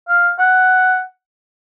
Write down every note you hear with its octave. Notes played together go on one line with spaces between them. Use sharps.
F5
F#5